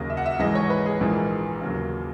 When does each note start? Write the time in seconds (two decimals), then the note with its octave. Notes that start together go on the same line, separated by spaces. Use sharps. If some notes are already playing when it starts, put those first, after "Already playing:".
Already playing: D#2 C#3 F#3 A#3 D#5
0.10 E5
0.17 F#5
0.26 E5
0.39 G#1 G#2 E3 G#3 D#5
0.55 C#5
0.70 B4
0.86 G#4
1.01 A#1 G#2 E3 A#3
1.62 D#2 C#3 F#3 A#3